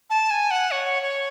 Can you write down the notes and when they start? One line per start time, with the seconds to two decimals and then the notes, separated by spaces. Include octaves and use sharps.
0.10 A5
0.30 G#5
0.51 F#5
0.71 C#5
1.02 C#5